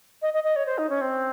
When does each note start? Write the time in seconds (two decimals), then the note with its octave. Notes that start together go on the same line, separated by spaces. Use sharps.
0.22 D#5
0.34 D#5
0.44 D#5
0.56 C#5
0.66 C5
0.78 D#4
0.90 C#4
1.01 C4